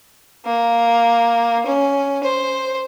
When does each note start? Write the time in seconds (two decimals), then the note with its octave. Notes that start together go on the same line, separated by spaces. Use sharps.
0.44 A#3
1.64 C#4
2.23 C5